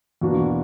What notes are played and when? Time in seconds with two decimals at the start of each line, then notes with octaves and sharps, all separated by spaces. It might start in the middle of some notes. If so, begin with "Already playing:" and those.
0.21 E2 B2 A#3 D4 F#4